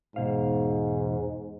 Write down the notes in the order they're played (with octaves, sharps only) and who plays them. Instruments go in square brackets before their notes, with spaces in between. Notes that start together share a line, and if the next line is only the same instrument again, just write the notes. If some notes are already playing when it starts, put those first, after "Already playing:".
[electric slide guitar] E2 B2 F5 [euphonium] G#2